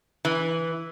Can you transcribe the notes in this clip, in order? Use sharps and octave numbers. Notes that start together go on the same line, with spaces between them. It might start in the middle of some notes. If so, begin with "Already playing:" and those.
E3